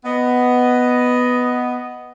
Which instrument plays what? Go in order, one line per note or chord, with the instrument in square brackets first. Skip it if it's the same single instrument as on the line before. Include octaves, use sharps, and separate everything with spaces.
[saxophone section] B3 D#5